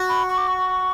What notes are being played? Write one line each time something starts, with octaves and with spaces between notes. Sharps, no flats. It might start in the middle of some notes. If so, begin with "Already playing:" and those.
Already playing: F#4
B5
C#6
D6
C#6